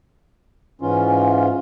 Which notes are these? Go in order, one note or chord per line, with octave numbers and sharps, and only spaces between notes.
G#2 E3 C#4 F4